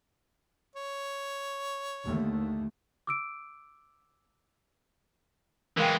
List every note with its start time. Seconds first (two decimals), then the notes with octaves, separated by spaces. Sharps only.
0.76 C#5
2.05 D#2 D3 A3
3.07 D6 E6 D7
5.78 E3 G#3 A#4 F5 G5